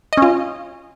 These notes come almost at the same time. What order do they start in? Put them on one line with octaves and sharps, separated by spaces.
D#5 C#4 F4